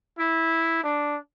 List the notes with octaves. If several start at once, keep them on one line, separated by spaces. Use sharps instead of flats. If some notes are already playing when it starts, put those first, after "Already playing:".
E4
D4